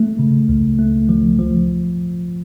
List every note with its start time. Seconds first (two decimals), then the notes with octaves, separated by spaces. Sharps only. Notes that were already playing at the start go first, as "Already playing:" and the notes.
Already playing: A3
0.19 C#3
0.49 C#2
0.79 A3
1.09 F3
1.39 F3